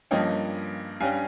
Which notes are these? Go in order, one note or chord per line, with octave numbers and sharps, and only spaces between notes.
G2 F3 A#3 C#4 D#5 G5
G2 G3 C#4 F5 G#5